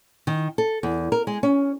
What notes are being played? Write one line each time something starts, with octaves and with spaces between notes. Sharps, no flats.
D#3
A4
E2
A#4
G#3
C#4